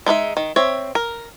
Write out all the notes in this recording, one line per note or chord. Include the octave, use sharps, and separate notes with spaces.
G#3 D#4 B4 E5
D#3
C4 C#5 E5
A#4